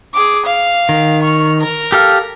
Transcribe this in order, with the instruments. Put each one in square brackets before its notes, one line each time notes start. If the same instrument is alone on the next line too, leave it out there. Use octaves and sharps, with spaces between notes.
[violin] G#4 D6
F5
[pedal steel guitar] D#3
[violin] C#6 F6
A#4
[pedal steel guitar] G4 A4 F5